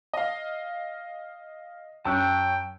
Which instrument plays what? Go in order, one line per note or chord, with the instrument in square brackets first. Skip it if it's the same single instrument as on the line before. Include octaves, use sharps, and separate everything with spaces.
[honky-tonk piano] D#5 F5
[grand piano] F#2 C#4 C#6 [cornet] G5 [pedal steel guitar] A5 E6 F#6